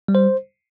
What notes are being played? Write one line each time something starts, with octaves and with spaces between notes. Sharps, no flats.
G3
C5